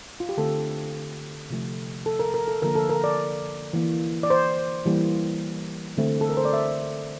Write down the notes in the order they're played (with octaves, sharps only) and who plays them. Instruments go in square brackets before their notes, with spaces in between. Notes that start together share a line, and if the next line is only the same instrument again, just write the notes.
[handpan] F4
G4
D3 A3 C4 A4
C3 F3 A3
A4
A#4
A#4
A4
D3 F3 A#3 A#4
A4
A#4
D5
E3 A#3
D5
C5
E3 G3 A#3
D3 A3 C4
A4
A#4
C5
D5
E5